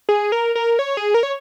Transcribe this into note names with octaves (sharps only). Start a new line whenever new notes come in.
G#4
A#4
A#4
C#5
G#4
A#4
C#5